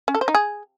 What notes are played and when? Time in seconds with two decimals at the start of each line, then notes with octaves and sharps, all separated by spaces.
0.08 C#4
0.15 A4
0.21 C5
0.28 D#4
0.35 G#4